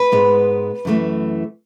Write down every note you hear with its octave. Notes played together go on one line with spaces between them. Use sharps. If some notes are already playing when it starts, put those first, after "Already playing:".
Already playing: B4
G#2 G#3 B3
F#2 E3 A3